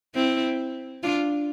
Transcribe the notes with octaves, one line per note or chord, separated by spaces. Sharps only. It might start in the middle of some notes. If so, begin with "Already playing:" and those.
C4 E4
D4 F4